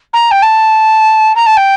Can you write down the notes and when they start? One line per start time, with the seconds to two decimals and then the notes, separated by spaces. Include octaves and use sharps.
0.13 A#5
0.31 G5
0.42 A5
1.35 A#5
1.46 A5
1.57 G5